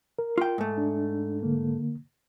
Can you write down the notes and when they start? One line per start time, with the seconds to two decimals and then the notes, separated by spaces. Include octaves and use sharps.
0.19 A#4
0.38 F4 G5
0.58 G#2 A3
0.78 D4
1.43 D3 A#3